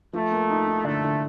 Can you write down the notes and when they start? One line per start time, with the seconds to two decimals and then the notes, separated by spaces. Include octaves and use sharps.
0.13 F3 A3
0.31 A#3
0.50 D#4
0.68 D#4
0.85 D3 A3
1.04 D3